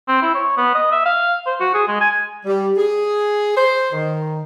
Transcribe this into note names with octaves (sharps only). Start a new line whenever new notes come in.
C4
E4
C#5
B3
D#5
E5
F5
C5
F#4
G#4
G#3
G#5
G3
G#4
C5
D#3